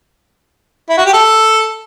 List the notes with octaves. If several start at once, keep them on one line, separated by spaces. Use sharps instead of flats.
E4
F#4
G4
A4